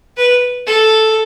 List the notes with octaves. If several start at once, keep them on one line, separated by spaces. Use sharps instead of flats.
B4
A4